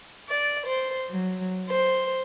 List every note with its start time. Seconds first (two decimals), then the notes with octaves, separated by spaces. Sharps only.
0.28 D5
0.66 C5
1.11 F#3
1.69 C5